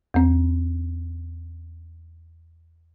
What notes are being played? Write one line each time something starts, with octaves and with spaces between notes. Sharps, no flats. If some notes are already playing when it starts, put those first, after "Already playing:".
E2 C4